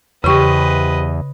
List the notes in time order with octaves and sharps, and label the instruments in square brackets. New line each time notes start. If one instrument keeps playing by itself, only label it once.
[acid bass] E2 [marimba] C#3 C#6 [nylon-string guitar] G4 C5 [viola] B4 D#5